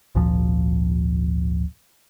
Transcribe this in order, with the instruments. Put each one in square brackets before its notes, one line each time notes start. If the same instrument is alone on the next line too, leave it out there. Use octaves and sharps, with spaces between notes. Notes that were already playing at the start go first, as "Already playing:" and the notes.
[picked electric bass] G#1 D2 A#2 F3